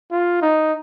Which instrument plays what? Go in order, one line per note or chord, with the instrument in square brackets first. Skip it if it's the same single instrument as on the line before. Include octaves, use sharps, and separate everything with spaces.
[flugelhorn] F4
D#4